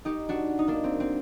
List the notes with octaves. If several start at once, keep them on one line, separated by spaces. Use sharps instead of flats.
D#4 G4
D4 F#4
D#4
A#3 D4
C4
C4